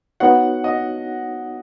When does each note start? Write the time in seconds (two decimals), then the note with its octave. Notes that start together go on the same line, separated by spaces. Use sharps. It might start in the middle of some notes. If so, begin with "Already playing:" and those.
0.20 B3 D#4 F#4 C#5 F#5
0.64 D#5